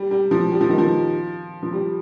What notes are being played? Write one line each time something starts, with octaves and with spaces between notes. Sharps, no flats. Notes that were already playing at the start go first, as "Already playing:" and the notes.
Already playing: G3
G3
F3
G3
F3
D#3
F3
F3
G3